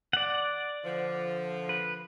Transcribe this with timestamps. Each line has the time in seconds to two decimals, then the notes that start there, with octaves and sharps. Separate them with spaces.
0.13 D5 F#5
0.85 D3 F3
1.69 B4